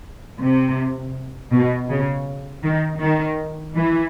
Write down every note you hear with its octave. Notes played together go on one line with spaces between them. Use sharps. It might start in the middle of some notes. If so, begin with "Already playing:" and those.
C3
B2
C#3
D#3
D#3
E3